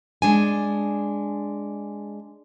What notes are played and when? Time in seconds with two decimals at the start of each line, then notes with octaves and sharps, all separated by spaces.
0.22 G#3 D4 G#5